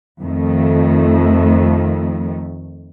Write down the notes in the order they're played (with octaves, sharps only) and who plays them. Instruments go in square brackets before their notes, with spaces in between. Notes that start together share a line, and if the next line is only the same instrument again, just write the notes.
[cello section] F2 D#3 A3